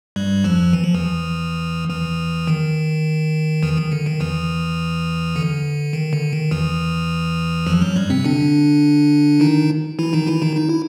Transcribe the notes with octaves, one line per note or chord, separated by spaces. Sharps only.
G2 G3
F2 F3
E3
F3
E2 E3
E2 E3
D#3
E2 E3
D#3
D3
D#3
E2 E3
D3
D#3
D3
D#3
E2 E3
F2 F3
F#2 F#3
G2 G3
C3 C4
D3 D4
D#3 D#4
E3 E4
D#3 D#4
E3 E4
D#3 D#4
D#4
E4